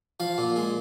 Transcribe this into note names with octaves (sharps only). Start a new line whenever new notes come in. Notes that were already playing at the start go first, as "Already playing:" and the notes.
F3 F5
A#2
G#3